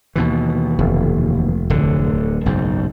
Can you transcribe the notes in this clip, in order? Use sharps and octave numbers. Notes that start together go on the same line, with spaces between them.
D#2 B2 E3
F1
D1 D3
F#1 B1 G#2